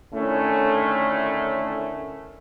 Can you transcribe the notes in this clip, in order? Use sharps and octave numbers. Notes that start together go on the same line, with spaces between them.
A2 D3 D#3 A3 C#4